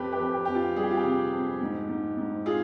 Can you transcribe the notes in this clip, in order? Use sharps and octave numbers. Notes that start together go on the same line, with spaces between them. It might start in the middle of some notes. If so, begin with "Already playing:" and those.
Already playing: F2 G4 B4
G4 B4
F2
G4
F2 G4
F4
G3 G#4
G4
F4
G4
C3
F2
G#2
G#2
G#2
F4 G#4